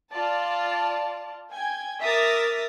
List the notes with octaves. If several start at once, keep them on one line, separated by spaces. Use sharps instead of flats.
F4 D5 A5
G5 G#5 G#6
A#4 E5 D6 D#6 A6 A#6